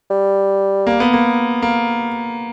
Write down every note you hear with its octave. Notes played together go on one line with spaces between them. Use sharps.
G3
A#3
B3
A#3
A#3